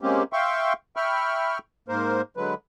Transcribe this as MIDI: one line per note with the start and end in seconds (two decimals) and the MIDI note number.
0.01 0.23 56
0.01 0.23 58
0.01 0.23 60
0.01 0.23 61
0.01 0.23 67
0.33 0.73 76
0.33 0.73 77
0.33 0.73 79
0.33 0.73 84
0.33 0.73 85
0.96 1.58 76
0.96 1.58 79
0.96 1.58 83
0.96 1.58 85
0.96 1.58 89
1.88 2.22 44
1.88 2.22 58
1.88 2.22 70
1.88 2.22 72
2.37 2.54 50
2.37 2.54 54
2.37 2.54 56
2.37 2.54 71